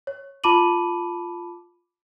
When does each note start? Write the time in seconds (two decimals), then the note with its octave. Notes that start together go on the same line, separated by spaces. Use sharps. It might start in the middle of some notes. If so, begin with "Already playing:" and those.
0.07 C#5
0.44 F4 A5 B5 D6 D#7 F#7